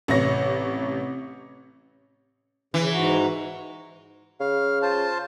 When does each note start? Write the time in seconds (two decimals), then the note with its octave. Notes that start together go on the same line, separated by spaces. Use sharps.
0.08 A1 C3 C#5 A#6
2.74 C#3 E3
2.93 G#2 F#4 A#5
4.40 C#3 F5
4.82 F4 C5 A5